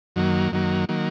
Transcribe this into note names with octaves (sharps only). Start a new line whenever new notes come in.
F#2 D#3 F#3 A#3
F#2 D#3 F#3 A#3
D#3 F#3 A#3